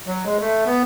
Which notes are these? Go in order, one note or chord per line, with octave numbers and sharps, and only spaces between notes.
F#3
G#3
A3
B3